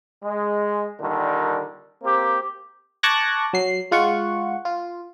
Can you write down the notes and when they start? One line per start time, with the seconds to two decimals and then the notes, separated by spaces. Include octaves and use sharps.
0.23 G#3
1.01 A#2 D3 D#3 G3
2.03 A#3 C4 G4
3.03 A5 C#6 D6 F#6 G#6 A#6
3.53 F#3 C7
3.91 G#3 F4 F#5 C#6
4.65 F4